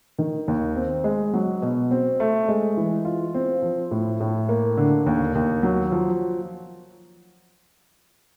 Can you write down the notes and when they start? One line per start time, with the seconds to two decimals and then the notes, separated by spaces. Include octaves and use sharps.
0.19 D#3
0.48 D#2
0.76 C4
1.04 G#3
1.33 F#3
1.62 B2
1.91 C4
2.20 A3
2.48 G#3
2.77 E3
3.05 F4
3.34 C4
3.62 F3
3.91 A2
4.20 A2
4.49 A#3
4.77 D3
5.06 D#2
5.35 D#2
5.63 F#3
5.92 F3